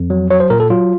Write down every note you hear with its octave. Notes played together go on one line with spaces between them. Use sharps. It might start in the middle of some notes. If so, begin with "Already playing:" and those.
Already playing: F2
F#3
F#3 C#5
C5
A#2 A#4
A4
F#3 F4